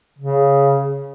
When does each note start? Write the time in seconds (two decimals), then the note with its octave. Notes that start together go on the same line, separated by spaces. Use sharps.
0.18 C#3